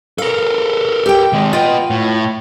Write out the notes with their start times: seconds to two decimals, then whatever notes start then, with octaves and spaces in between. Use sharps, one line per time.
0.18 A4 A#4 F5
1.06 G4 G5
1.33 D#3 G#3
1.53 B3 F4 D#5 G5
1.90 A2